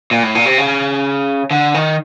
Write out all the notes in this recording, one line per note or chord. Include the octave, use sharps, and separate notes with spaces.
A#2
A2
A#2
C3
C#3
D3
D#3